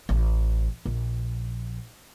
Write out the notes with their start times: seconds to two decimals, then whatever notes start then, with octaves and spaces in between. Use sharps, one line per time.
0.09 A1
0.85 A#1